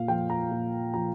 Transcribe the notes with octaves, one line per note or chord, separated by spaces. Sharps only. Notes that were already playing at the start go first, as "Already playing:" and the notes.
Already playing: A#2 F5
F3 G5
A#5
A#2
F3 A#5